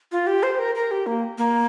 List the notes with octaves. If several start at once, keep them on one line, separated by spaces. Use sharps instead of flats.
F4
G4
C5
A#4
A#4
G4
A#3
A#3